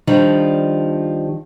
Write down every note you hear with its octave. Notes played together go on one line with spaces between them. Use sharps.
D#3 F3 G3 D4